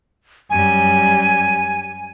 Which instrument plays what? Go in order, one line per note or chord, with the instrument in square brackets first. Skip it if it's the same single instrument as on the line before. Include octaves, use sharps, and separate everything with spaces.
[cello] F#2 G3 [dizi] G#5